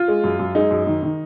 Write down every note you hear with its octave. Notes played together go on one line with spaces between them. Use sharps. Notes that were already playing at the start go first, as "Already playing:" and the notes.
Already playing: F4
G#3
F#2
F#2
G#3 D#4
F#2
D#3
D#3